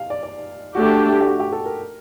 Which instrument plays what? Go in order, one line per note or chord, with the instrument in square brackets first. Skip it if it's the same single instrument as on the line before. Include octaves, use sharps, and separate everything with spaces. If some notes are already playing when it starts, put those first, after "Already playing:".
Already playing: [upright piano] F5
D5
D5
[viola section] A3 D4 G4 [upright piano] F#4
[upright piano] G4
F#4
G4
A4
A#4